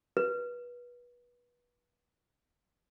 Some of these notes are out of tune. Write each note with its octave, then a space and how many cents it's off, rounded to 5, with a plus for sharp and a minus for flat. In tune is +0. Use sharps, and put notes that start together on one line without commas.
B4 -25